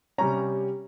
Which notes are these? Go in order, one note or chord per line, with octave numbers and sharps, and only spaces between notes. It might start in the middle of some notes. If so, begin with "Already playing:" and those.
C3 G3 C#4 A#5